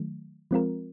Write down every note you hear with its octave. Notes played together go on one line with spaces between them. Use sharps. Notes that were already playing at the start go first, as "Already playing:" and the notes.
Already playing: D#3 F#3 A3
F3 G#3 C4 F4 A#4